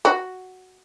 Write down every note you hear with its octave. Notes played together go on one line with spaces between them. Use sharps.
F#4